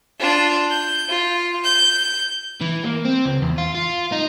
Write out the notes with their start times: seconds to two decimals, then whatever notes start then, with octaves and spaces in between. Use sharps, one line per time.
0.20 D4 F4
0.70 G6
1.09 F4
1.64 G6
2.61 E3
2.84 A#3
3.05 C4
3.25 C#2
3.42 E2
3.58 F4
3.75 F4
4.12 D#4